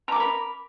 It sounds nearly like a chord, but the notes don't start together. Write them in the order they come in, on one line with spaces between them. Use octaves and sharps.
A#5 D6 A#4 B5